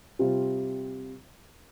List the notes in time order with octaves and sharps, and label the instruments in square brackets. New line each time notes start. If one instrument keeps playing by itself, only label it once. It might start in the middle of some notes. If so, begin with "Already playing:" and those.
[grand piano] C3 G3 F4